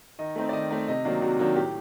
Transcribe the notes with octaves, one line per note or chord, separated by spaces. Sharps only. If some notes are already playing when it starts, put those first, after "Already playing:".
D#3 D#5
A3 C4 D#4
D5
D#3 D#5
A3 C4 D#4
C3 D#5
D#3 F#3 A#3 D4
C3 F#4
D#3 F#3 A#3 D4
A2 G4